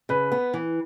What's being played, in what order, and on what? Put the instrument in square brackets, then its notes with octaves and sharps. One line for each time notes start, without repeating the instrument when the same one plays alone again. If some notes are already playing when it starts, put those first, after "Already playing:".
[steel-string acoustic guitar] C#3 [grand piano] B4
[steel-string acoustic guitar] B3
E3